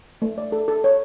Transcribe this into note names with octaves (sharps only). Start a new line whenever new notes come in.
A3
D5
A4
A4
C#5